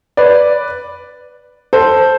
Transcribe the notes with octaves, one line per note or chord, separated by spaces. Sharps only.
B4 D5
A4 C5